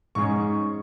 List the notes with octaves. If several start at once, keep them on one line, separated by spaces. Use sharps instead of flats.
G#2 G#3 C#4 C#6